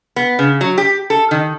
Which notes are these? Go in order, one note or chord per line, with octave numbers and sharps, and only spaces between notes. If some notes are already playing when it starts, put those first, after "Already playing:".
B3
C#3
F#3
G4
A4
D#3